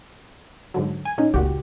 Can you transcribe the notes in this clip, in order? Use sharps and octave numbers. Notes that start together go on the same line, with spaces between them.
G#2 D3 F#3
G#5
A#2 C#4 D#4
C#2 A#2 F#4 G4